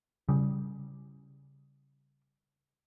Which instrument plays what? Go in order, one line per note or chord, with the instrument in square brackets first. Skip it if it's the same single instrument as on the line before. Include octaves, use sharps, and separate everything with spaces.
[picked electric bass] C#3 G3